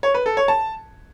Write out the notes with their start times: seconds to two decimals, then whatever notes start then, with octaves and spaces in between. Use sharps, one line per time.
0.03 C#5
0.14 B4
0.26 A4
0.37 C#5
0.48 A5